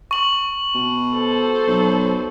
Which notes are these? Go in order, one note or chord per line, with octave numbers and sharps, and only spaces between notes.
C#6 F#7
B2
A4 C5
B1